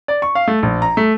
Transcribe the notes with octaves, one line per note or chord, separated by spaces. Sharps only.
D5
C#6
F5
A3
A#1
A#5
A3